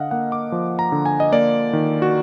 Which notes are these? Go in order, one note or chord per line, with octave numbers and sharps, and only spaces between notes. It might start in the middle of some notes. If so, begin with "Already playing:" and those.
Already playing: D3 D#5 F5 F#5
A#3 F#5
D6
F3
A#5
D3
G#5
D#5
A#3 D5
D#3
F#4